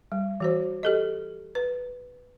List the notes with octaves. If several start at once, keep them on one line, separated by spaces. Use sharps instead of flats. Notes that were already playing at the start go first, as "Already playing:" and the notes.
G3
E3 F#4 C5
G4 A4 D#5
B4